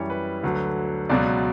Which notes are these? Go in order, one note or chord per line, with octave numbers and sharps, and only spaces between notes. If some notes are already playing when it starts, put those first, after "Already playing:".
Already playing: F#2 E3 G3 C#5
B4
D2 D3 F#3
C#2 B2 F#3 D5